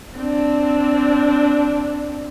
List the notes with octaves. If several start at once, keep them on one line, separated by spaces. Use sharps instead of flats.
C4 D4